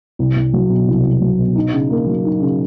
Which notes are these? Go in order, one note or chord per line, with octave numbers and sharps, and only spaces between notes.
C2
C2
F#3
B2
C2
C2
F#3
B2
D#4
C#3
A#3
F#3
D#4
C#3